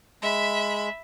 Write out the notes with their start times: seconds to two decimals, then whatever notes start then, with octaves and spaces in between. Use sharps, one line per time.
0.22 G#3 E5 B5